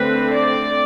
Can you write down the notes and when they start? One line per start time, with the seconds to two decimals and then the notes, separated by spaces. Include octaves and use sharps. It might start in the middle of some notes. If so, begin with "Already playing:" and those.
Already playing: D3 A3 C4 B4
0.33 D5